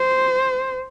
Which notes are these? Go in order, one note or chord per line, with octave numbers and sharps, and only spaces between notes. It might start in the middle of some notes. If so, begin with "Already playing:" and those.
Already playing: C5